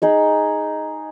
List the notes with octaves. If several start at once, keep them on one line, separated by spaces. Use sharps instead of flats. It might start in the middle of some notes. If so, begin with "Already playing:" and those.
D#4 G#4 D#5